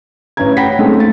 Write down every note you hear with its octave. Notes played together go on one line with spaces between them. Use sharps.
A1 C#4 B4 A#5 G#6
C#5 F#5 G5 B5 A#6 B6
G#3 A3 C4 C#4 D#4 A4
A3 A#3 A6